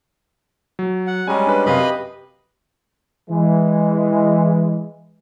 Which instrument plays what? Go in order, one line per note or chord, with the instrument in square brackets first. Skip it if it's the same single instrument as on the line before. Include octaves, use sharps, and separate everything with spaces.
[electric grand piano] F#3
[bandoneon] F#5
[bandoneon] G3 G#3 C#4 [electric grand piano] G#5 A#5
[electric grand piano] D4 B4
[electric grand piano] F#2 C3 F5 [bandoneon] B4 D#5 B5
[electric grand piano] G4
[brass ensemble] E3 G#3